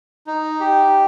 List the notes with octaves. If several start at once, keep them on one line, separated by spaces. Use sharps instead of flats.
D#4
G4